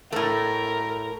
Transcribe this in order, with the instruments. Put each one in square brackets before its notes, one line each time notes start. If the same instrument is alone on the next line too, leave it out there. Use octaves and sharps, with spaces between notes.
[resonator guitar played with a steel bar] A2 A3 [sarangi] A#4